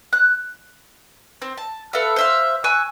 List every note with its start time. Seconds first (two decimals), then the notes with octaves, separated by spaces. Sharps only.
0.13 F#6
1.42 C4
1.57 A5
1.93 A4 B4 E5 F5
2.16 C5 E5 F5
2.64 G#5 C#6 E6 F#6